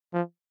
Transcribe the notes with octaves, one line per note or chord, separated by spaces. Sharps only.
F3